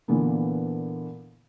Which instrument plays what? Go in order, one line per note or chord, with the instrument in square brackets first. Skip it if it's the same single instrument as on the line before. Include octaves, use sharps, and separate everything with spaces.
[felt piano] A#2 D3 E3 A#3 B3